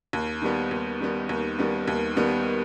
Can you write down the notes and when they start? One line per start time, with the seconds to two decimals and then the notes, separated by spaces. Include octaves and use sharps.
0.13 D#2
0.42 D#3 G3 B3
0.71 D#2
1.00 D#3 G3 B3
1.29 D#2
1.59 D#3 G3 B3
1.88 D#2
2.17 D#3 G3 B3